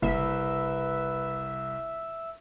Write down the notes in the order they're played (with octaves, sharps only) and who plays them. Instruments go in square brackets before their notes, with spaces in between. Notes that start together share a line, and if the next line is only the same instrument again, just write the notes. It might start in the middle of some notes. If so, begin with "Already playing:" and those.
[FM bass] F#1 [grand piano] C2 [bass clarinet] B4 [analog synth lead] E5